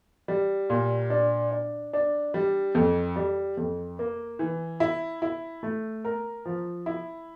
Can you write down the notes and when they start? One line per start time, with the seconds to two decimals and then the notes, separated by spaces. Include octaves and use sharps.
0.28 G3
0.70 A#2
1.10 D4
1.51 D4
1.93 D4
2.34 G3
2.75 F2
3.16 G3
3.57 F2
3.99 A#3
4.39 E3
4.80 E4
5.22 E4
5.63 A3
6.05 A#4
6.45 F3
6.86 E4